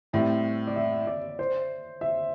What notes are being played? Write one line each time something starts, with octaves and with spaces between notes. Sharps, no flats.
A2 G3 C4 E5
D5
E5
D5
C5
E5